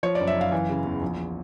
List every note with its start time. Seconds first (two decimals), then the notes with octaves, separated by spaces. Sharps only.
0.03 F3 C#5
0.15 D5
0.20 F#1
0.27 E5
0.36 F#1
0.41 F5
0.52 E3
0.69 C#3
0.85 E2
1.02 A#1